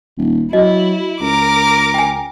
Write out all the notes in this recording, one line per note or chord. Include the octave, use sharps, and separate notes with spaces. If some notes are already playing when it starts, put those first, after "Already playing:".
D#1
F#3 E4 D#5
C#2 A#4 D6
G5 G#5